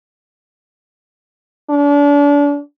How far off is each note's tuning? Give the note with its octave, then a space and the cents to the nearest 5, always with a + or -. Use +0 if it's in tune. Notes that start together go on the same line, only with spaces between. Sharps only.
D4 -35